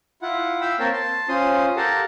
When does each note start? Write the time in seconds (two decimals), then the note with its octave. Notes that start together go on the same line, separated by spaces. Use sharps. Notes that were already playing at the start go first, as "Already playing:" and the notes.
0.22 E4 F4 F#5
0.61 F5 G5 B5 E6
0.79 A#3 C4 A#4 C#5 G5 A5
0.93 A5 C6
1.28 C#4 F4 C5 C6 D#6
1.76 G4 A4 A#4 F5 F#5 A5